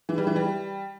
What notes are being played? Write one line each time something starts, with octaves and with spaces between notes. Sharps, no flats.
E3
G3
E3
G3